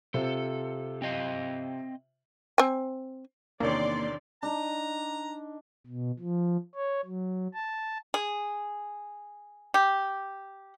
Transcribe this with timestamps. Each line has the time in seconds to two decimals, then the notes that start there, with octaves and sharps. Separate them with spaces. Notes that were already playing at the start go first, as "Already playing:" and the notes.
0.14 C3 F4 A4 C5
1.02 C4 D#5 F5
2.58 C4 G#5
3.60 E2 C3 D#3 A#3 D4 C#5 D5 C6
4.43 D4 D#4 D#5 A#5
5.87 B2
6.19 F3
6.75 C#5
7.05 F#3
7.54 A5
8.14 G#4
9.74 G4